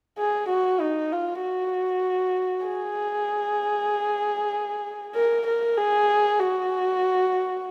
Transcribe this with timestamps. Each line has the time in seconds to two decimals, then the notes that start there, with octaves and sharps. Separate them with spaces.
0.18 G#4
0.49 F#4
0.80 D#4
1.12 F4
1.42 F#4
2.66 G#4
5.15 A#4
5.47 A#4
5.77 G#4
6.40 F#4